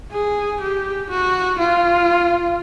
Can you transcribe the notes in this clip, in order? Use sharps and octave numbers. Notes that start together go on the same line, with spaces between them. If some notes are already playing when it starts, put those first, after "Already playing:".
G#4
G4
F#4
F4